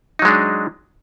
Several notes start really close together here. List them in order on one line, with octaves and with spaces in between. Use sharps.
D#4 F#3 G#3 D4